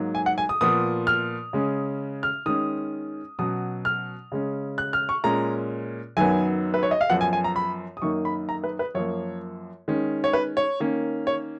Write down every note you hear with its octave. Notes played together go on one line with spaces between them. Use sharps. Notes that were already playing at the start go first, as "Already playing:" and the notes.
Already playing: G#2 F#3 A#3 D#4
G#5
F#5
G#5
D#6
A#2 F3 B3 D#6
F6
C#3 G#3 C#4
F6
D#3 G#3 C#4 D#6
B2 F#3 C#4 D#6
F6
C#3 G#3 C#4
F#6
F6
C#6
A#2 G#3 C#4 A#5
F#2 D#3 F#3 B3 G#5
B4
C#5
D#5
F5
F#2 F3 B3 F#5
G#5
G#5
A#5
B5
D#6
F#2 D#3 A#3 D#4 C#6
B5
A#5
B4
B4
F#2 F3 A#3 C#5
D#3 G#3 C#4
C#5
B4
C#5
D#3 A#3 C#4
C#5